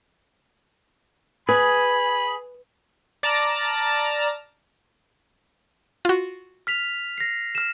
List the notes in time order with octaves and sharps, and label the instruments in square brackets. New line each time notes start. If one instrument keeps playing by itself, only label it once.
[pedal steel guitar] G#4 [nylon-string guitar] B4 [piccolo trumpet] B5
[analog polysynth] D5 A5 A#5 D6 F6
[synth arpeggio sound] F4 F#4
[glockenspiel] F6 B6 F7
A#6 C7
F6 E7